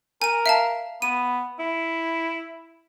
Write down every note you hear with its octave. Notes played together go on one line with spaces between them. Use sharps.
A#4 G#5 D#7
E5 F5 A5
B3 D#7
E4